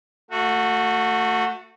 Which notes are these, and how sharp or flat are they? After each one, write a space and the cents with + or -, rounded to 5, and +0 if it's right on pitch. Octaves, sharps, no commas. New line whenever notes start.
A3 +25 F#4 -15